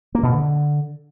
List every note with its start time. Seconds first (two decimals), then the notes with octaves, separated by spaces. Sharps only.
0.15 A#3
0.23 B2
0.31 D3